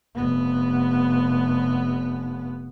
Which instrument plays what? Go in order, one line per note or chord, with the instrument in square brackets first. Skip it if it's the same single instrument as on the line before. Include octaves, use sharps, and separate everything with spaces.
[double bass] F1 B3